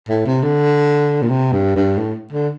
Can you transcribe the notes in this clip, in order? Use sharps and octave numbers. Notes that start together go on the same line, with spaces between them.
A2
C3
D3
A#2
C3
G2
G2
A2
D3